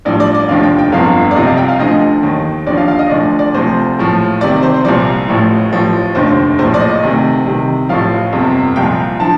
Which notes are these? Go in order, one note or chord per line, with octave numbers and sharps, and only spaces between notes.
A1 G2 F3 D5
D5
D5
F1 D#2 D3 F3 F5
G5
G5
G1 F2 D3 F3 F5
D5
C2 C3 F3 D#5
F5
G5
F5
D2 D3 F3 D#5
D#2 D#3
D#2 D3 F3 D5
F5
F5
D#5
D2 D3 F3 D5
D5
D2 C3 F3 C5
A#1 A2 F3
C2 C3 D#3 D5
D5
C5
C5
C2 A#2 F3 D5
A1 A2 F3
A1 A2 F3
F1 D#2 D3 C5
A#1 A2 F3 C5
D5
D#5
D2 C3 D#3
C2 C3 D#3
A1 A2 F3 F5
G1 F2 C3
C2 A#2 F3 G5
D3 F3 A5